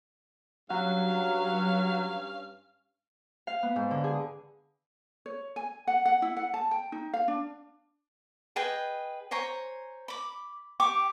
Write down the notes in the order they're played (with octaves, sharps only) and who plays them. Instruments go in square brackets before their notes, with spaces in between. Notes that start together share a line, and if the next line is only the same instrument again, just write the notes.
[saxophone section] G2 C#4 F5 [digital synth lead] F#3
[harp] F5
B3
G#2
D3
G#4
[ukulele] C#5
G#5
F#5
F#5
E4
F#5
A5
G5
D#4
F5
D4
[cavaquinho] G#4 B4 D#5 G5
C5 C#5 G#5 A#5
B5 D6
G4 G5 C#6 D6